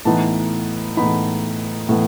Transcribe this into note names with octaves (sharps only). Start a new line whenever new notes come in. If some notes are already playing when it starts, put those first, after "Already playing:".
A2 E3 B3 D#4 A5
A2 E3 B3 D#4 B5
A2 E3 B3